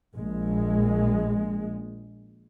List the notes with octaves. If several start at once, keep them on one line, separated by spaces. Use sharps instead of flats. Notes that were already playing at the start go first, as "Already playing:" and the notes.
A#1 G#3